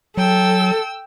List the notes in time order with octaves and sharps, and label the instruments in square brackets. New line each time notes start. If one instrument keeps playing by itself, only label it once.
[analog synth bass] F#3 [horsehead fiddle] A4 [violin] G5 E6